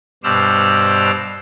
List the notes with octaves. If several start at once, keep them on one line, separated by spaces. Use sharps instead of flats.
G2 B2 C5 D5 E6 F6